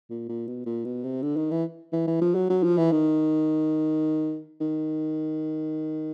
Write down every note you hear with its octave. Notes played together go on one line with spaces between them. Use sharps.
A#2
A#2
B2
A#2
B2
C3
D3
D#3
E3
E3
E3
F3
F#3
F#3
F3
E3
D#3
D#3